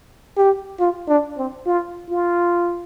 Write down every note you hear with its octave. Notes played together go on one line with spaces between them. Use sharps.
G4
F4
D4
C4
F4
F4